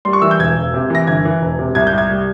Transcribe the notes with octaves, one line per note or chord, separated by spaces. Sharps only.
G3 C6
C#6
E3 E6
G6
E1 G#6
E1
C3
E3 A#6
G1 G#6
E3
E1
C3
C2 G#6
G6
C2
G#6
G3